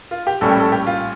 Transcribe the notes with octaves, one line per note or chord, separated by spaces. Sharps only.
F4
G4
A#1 A2 G3 C#4 A4
G4
A4
G4
F4